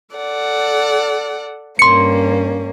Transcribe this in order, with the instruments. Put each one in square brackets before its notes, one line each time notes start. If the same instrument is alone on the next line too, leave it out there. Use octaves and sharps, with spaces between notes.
[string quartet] A4 D5 F#5
[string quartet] G2 A#3 C#4 [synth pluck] C6 C#7